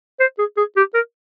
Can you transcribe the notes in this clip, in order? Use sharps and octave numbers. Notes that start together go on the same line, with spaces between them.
C5
G#4
G#4
G4
A#4